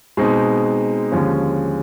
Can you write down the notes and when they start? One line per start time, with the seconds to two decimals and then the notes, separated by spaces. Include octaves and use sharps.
0.17 B2 G#3 C4 D#4
1.12 D#2 D3 F3 G#3 C#4